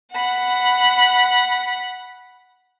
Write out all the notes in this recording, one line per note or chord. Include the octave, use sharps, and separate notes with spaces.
F#5 B5